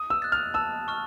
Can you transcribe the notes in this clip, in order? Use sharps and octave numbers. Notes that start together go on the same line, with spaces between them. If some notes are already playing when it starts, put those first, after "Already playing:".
Already playing: D#6
E6
F#6 A6
F6
A5 E6
C#6 F6